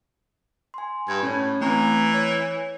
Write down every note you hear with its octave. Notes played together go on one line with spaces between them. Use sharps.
G#5 C6
G2 B5 G#6
A2 C#4 C#5
E3 A3 C4 A#5
C#5